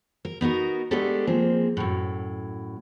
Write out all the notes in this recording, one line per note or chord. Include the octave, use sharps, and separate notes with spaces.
A#4
B3 D#4 F#4 A#4
G#3 A3 B3 D4 G4 A4
F3 A#3 C4 G#4
F#2 A2